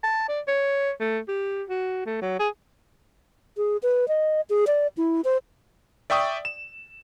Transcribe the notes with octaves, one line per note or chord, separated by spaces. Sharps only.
A5
D5
C#5
A3
G4
F#4
A3
F#3
G#4
G#4
B4
D#5
G#4
D5
E4
C5
D5 E5 G5 C#6 D#6
E7